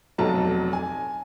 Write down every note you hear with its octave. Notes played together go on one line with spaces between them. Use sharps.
F1 B1 F#3 A5 A#5
G#5